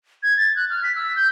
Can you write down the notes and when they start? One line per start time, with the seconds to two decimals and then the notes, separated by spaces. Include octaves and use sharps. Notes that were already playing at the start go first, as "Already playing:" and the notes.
0.23 G#6
0.37 A6
0.56 F#6
0.70 F6
0.83 B6
0.96 E6
1.16 G6